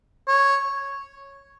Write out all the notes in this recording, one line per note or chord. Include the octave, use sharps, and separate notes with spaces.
C#5